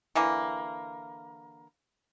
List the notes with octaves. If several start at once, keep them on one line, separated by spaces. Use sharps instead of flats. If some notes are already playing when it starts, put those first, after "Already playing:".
D3 E3 A#3